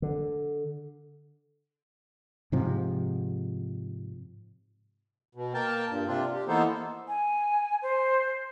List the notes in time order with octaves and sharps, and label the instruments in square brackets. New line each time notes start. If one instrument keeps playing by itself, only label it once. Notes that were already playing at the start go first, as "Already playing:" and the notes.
[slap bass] D3
[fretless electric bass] G#2 C3 F3
[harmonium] B2
A#3 A#4 G5 A5
G2 A#2
C3 C4 D4 F4
G4
E3 A#3 B3 D#4 A4 C5
[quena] G#5
C5